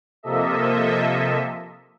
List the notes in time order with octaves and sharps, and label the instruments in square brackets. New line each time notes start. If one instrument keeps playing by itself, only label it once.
[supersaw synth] C3 F3 A#3 A4 D#5 E5